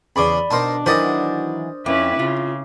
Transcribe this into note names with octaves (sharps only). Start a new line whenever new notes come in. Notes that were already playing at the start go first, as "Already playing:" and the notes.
E2 C#3 D5 B5 D6
B2 D4 D#4 A#4 C5 A5 D6
D#3 E3 F#3 A#4 C5 D5 D#5 D#6
F2 C#4 E4 B4 D6
C#3 F4